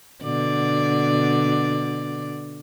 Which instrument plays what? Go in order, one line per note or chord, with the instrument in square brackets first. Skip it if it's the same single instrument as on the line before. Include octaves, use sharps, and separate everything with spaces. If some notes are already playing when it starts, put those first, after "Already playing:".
[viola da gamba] B2 D3 D5